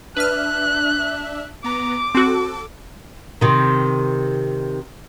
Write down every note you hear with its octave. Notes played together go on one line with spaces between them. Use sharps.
D4 B4 E5 F6 F#6
B3 A#5 D6
C4 F#4 A4
C3 D#3